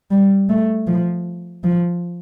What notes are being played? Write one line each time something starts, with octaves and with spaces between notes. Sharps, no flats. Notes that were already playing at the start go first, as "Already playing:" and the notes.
G3
A3
F3
F3